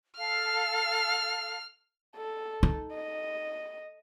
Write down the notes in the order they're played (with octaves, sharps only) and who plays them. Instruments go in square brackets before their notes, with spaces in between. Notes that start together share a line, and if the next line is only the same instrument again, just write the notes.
[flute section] A4 F5 [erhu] F6
[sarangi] A4
[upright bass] D#4
[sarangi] D#5